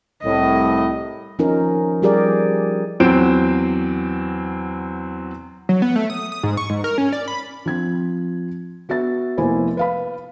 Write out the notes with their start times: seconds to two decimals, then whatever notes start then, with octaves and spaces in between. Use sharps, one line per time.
0.23 C2 A2 D#5
1.39 F3 C#4 D#4 A#4
2.02 F3 G3 G4 G#4 A#4 D5
3.00 E2 F#3 C4 C5 D7 E7
5.69 F#3
5.82 B3
5.96 A3
6.10 D#6
6.32 D#6
6.43 G#2
6.57 C#6
6.70 G#2
6.84 A#4
6.98 C#4
7.12 D5
7.28 B5
7.66 F3 C4 G#6
8.89 B3 F#4 E5 A6
9.37 F1 A#3 B3 E4 C5 G#5
9.77 B4 F5 B5